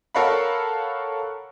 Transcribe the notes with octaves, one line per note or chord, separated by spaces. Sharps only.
A4 A#4 C#5 F5 F#5 B5